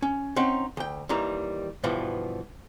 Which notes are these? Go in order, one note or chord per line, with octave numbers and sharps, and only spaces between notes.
C#4
C4 C#4 D#4 F#5
D2 G5
D#2 D#3 E3 G3 A#5
G2 B2 E3 F3 B3